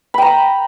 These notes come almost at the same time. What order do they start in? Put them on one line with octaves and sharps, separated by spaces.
B5 G5 A#5